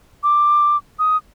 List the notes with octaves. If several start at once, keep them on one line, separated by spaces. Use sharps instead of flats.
D6
D#6